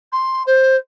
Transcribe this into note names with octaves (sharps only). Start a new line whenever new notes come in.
C6
C5